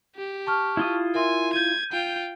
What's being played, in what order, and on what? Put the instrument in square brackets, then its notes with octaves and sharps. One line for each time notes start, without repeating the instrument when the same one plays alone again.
[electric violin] G4
[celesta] A5 C#6 F6
[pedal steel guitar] E4 F4 D#6
[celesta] A#4 E5 C6 [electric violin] G#5
[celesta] G6 D#7 [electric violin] G#6
[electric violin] F4 G5